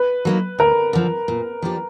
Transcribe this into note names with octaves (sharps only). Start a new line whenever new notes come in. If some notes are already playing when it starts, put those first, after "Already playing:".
Already playing: B4
F#3 A#3 D#4
D2 A#4
D3 F3
A#2
F3 A#3 D4 G4